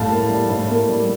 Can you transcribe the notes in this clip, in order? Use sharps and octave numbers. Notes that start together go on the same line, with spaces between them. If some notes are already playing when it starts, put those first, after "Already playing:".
Already playing: A2 G3 F5 A5
A#3
G3
A2
A#3
G3